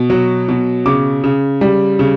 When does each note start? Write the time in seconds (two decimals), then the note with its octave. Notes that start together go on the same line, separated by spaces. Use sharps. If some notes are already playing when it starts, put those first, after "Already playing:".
Already playing: B2
0.10 F#3
0.48 B2
0.86 C#3 D6
1.24 C#3
1.61 G3
1.99 C#3